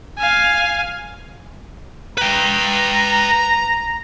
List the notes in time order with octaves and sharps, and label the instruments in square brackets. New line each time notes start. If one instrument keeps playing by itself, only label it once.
[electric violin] F5 G#5
[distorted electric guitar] B4 G5 [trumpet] A#5